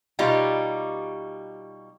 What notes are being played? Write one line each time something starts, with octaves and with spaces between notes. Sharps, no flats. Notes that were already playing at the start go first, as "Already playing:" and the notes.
B2 G3 D#4 F4 G4